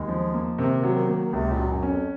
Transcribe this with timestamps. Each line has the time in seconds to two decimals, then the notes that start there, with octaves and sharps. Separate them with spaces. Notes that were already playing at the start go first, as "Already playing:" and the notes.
Already playing: D#2 G#3
0.08 F3
0.34 A#3
0.58 C3 D#3
0.77 D#3
0.83 F#3
0.96 D#3
1.09 A#3
1.15 D#3
1.33 C#2 C3
1.52 A#2
1.58 F#3
1.71 F#2
1.83 C#4
1.90 F2